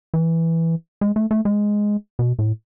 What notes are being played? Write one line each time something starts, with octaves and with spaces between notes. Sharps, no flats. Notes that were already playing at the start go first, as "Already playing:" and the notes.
E3
G#3
A3
A3
G#3
B2
A2